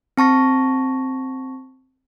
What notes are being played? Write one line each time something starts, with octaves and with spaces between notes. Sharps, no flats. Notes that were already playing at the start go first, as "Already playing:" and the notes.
C4 A5 C#6 A#6